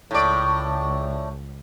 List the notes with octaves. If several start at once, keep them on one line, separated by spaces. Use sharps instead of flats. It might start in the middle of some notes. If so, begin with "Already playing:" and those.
C#2 A2 D5